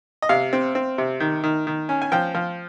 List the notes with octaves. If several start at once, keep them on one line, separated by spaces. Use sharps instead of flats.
D#5
C3 F5
C4
C4
C3
D#3
D#3
D#3
C#4
G#5
F3 G5
F3